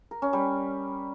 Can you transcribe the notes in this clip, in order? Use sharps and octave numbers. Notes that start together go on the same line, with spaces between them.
A#4
C#4
G3